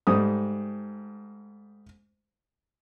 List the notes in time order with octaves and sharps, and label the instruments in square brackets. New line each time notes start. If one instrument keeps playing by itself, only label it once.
[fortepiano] G#2 G3 A3 D#6